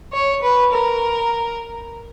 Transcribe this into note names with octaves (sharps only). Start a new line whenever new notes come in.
C#5
B4
A#4